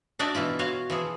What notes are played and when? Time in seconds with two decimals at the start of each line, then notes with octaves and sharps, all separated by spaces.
0.19 D4 D#4 F#4 D5 E5
0.35 B2 E3 E4 F4
0.59 F4 F#4 C#5 F5
0.90 E3 F3 G#4